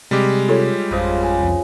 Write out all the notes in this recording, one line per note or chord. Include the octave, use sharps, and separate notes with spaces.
C3 G3 G#3 G4
F4 A4 C#5
G#1 F2 C#3 F3 C5 D#5
G#5
C2 F2